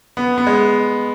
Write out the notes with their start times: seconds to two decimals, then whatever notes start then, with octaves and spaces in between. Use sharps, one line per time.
0.17 B3
0.38 B3
0.47 G#3